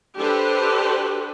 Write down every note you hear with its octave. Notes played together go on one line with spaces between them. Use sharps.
D4 G4 A4 B4 C5